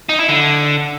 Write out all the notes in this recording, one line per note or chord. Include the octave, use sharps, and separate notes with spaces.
D#4
E4
D3